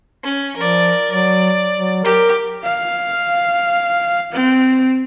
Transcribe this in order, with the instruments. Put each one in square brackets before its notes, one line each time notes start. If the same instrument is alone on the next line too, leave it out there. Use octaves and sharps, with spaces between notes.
[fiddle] C#4
[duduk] F3 [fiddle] A#4 D5
[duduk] F#3 [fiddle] D5
[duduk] F#3
[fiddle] G4 [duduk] A#4
[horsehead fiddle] F5
C4